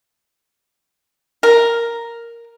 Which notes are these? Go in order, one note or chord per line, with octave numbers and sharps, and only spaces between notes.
A#4